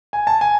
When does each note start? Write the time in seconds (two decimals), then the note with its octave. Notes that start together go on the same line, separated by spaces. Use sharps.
0.13 G#5
0.27 A5
0.41 G#5